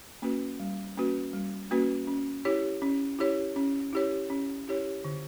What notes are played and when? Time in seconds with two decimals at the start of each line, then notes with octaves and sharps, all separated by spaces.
0.22 A#3 C#4 F#4 B4
0.60 G3
0.97 A#3 C#4 F#4 B4
1.33 G3
1.71 A#3 C#4 F#4 B4
2.07 C#4
2.45 E4 G4 C#5
2.82 C#4
3.19 E4 G4 C#5
3.56 C#4
3.93 E4 G4 C#5
4.30 C#4
4.68 E4 G4 C#5
5.05 D3